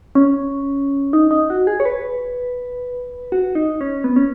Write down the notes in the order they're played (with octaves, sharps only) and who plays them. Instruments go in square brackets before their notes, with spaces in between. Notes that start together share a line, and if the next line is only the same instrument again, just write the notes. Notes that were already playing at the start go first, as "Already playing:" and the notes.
[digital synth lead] C#4
D#4
D#4
F#4
G#4
C#5
B4
F#4
D#4
C#4
B3
C#4